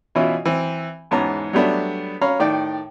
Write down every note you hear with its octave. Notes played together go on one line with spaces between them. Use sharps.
B2 E3 C#4 E4 F4
E3 C4
E2 G#2 B3 C#4 A5 A#5
F#3 G3 A3 B3 D4
C#4 C#5 F5 A#5 B5
A2 D#3 D5 G5